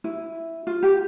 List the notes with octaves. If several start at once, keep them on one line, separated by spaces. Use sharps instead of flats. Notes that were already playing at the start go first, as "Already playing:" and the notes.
E4
F4
G4